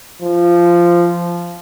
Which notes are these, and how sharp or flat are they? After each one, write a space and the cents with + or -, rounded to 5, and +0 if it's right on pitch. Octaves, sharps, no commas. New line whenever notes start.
F3 -15